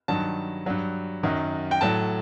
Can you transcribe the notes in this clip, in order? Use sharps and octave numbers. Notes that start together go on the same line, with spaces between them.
G2 D#3 F#3 A5
G2 F#3
F#2 D#3 F#3
G5
A2 F#3 A5